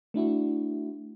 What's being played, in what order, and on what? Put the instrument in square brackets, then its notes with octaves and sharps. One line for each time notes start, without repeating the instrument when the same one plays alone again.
[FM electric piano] A3 D4 E4 F#4